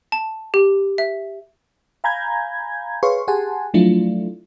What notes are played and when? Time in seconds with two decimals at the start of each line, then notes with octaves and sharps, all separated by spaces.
0.12 A5
0.54 G4
0.98 E5
2.04 F5 G#5 A#5 B5 G6 G#6
3.03 G#4 B4 C#5 F5 C6 C#6
3.28 G4 G#4 F#5 G#5 A5 C6
3.74 F3 F#3 A3 D4 E4 F4